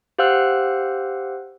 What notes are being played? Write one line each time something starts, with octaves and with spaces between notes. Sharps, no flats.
G4 C5 F5 F#5 E6 F#6